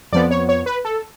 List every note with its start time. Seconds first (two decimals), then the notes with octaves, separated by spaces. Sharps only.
0.12 F2 F3 B3 D5
0.31 C#5
0.49 C#5
0.66 B4
0.85 A4